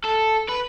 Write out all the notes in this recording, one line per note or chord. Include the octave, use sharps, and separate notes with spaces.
A4
B4